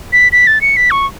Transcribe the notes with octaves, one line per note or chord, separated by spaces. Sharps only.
B6
B6
A6
C#7
B6
C#6